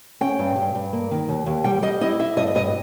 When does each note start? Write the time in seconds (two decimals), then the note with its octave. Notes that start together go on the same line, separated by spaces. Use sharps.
0.21 C#4 G5
0.39 G2
0.56 G2
0.75 G2
0.93 A#3
1.11 D#3
1.29 D#2
1.46 D#2
1.64 G3 G5
1.82 G3 D#5
2.01 E4 D#5
2.20 E4 E5
2.37 G2 D#5
2.55 G2 D#5